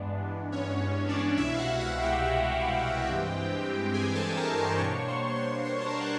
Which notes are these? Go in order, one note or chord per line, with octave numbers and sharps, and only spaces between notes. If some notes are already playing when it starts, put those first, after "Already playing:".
Already playing: G2 E3 G#3 B3 D4
C#4 C#5
D4 D5
C2 B2 G#3 E4 E5
F5
F#4 F#5
F#4 F#5
G4 G5
G2 E3 G#3 C4
G#4 G#5
A4 A5
A#4 A#5
C#6
C5 C6
B2 G3 A#3 D4 C#5 C#6
C5 C6
C#6
C5 C6
C5 C6
A5
A#4 A#5
F#5